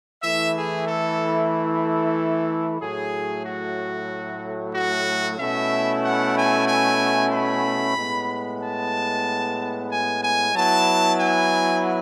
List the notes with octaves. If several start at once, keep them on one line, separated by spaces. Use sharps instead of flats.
E3 A3 E4 E5
G#4
A4
A4
A2 F#3 A3 G#4
F#4
F#4
B2 A3 C#4 E4 E5
F#5
G#5
G#5
B5
A2 G#3 B3
A5
G#5
G#5
F#3 B3 E4 A5
G#5